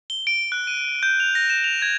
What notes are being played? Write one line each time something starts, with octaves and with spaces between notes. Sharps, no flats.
G7
D7
F#6
D#7
G6
F7
A#6
E7
F7
G#6